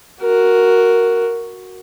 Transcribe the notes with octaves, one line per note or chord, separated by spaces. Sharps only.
F#4 A#4